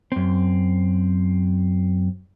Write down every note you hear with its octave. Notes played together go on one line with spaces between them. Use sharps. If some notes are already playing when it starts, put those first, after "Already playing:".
F#2 C4